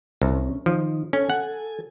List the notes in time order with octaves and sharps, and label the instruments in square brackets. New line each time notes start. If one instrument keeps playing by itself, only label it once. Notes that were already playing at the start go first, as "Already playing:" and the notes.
[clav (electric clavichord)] C2 [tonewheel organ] C4 C#4
[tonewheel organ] D#3 D#4 [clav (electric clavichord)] F3
[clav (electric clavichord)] C#4 [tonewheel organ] A4 G#5
[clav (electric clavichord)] F#5